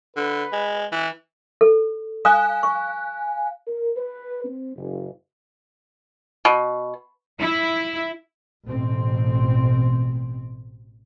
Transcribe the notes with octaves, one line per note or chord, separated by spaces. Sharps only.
D3 B4
G#3
E3
A4
F5 G#5 D#6 F#6
C#6
A#4
B4
C4
F#1
B2
E4
A1 B2 C4